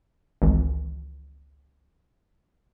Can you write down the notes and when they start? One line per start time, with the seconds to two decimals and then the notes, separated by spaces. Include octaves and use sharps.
0.42 G#1 C#2 E3